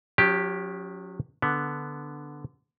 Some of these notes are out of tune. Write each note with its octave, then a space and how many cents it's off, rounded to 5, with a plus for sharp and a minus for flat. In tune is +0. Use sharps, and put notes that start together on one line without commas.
F#3 -35 C#4 +20 G4 +0
D3 +0 B3 +0